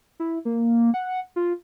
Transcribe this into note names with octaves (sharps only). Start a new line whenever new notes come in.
E4
A#3
F#5
F4